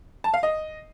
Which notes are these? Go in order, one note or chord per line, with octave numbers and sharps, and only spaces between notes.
A5
F5
D#5